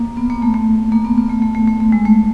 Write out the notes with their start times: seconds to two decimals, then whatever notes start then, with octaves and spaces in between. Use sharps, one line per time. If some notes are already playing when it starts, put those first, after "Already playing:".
Already playing: A#3
0.17 B3
0.30 A#3
0.42 A3
0.54 A3
0.92 A#3
1.05 B3
1.18 B3
1.30 A3
1.42 A3
1.55 A3
1.67 A3
1.80 A3
1.92 G#3
2.05 A3